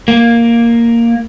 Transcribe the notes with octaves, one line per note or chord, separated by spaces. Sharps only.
A#3